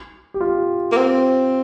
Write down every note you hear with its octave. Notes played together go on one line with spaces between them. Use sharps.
G4
F4
A#3
C4